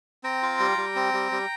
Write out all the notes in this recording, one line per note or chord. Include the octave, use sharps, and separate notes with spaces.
C4 G5 A#5
F4
G3
G3
C4
G3
G3